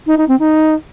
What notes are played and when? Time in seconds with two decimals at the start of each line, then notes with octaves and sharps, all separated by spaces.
0.07 D#4
0.17 D#4
0.28 C4
0.39 D#4